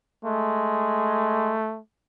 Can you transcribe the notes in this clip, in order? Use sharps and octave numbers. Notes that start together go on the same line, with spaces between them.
G#3 A3